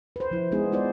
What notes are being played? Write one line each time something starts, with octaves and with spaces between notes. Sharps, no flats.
B4 C5
F3 E4
G#3 B3 D#4 G#4
D#4 F4 C5 D5